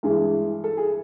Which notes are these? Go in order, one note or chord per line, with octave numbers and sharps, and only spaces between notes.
G2 E3 G#3 G#4
A4
G#4